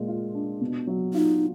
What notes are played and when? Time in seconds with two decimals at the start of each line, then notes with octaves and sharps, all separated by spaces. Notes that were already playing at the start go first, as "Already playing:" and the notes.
Already playing: A#2 G#3
0.08 F4
0.34 D4
0.61 B2
0.87 F#3
1.14 D#4 F4